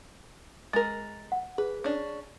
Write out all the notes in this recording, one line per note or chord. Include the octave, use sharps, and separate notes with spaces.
G#3 A#4 A6
F#5
G#4 B4
C#4 D4